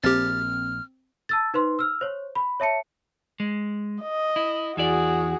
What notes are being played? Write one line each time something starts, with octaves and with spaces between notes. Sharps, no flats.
A#1 A#2 C4 G4 F6 A6
A5 E6 A6
D#4 B4 C5 C6
E6 F6
C5 C#5
B5
C#5 E5 A5 C#7
G#3
D#5
E4
E2 E4 F#4 G#4 D5